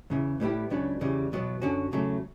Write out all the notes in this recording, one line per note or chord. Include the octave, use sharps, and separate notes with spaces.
E2 C#3 E3
A2 G3 B3 E4 G4
C#2 C#3 F#3 B3 D4
E2 C#3 E3 G3
E2 B2 F#3 B3
F#2 D3 F#3 C#4 F#4
E2 C#3 F#3 A3